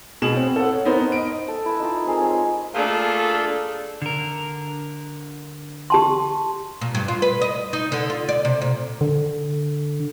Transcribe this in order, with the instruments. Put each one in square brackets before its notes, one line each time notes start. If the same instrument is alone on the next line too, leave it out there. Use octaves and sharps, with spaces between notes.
[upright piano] B2 G#4 E7 F#7
C4
A4 F#5
C#5
B3 D#4 A#4 C5
D#5 D7
[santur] A4
E4 B4
D#4 F4 A5
A5
C4 G#4 A#4
G#3 C#5
[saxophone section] A3 A#3 D4 F4 G#4 A4
[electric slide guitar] D3 A#4
[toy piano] G4 A5 C6
[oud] A#2
G2
F4
B4
D#5
D#4
D3
F4
D5
C3
A#2
[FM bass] D3